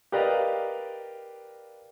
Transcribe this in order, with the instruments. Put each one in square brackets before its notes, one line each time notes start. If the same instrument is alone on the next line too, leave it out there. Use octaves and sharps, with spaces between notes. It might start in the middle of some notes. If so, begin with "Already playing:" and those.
[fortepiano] G4 A#4 B4 D5 D#5 F5